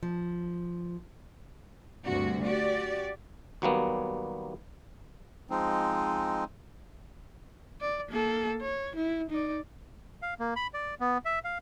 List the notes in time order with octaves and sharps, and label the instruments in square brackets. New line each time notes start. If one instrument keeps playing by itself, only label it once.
[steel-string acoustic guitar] F3
[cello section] D2 G2 C3 F#4
F#4 G4 D5
[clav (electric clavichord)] D#2 F#3 G3 A#3 B3
[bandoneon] F3 G#3 C4 D#4
[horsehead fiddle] D5
A#3 A4
C#5
E4
D#4 D5
[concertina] F5
A#3
B5
D5
B3
E5
F5